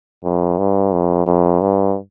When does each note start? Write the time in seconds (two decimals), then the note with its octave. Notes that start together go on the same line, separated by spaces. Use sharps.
0.24 F2
0.58 G2
0.92 F2
1.27 F2
1.61 G2